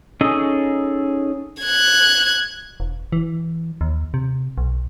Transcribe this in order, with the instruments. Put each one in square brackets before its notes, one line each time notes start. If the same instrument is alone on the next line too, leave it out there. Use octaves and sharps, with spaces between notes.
[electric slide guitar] C#4 D#4 G#4 A4 D#5
[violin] F#6 G#6
[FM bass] E1
E3
D#2
C3
B1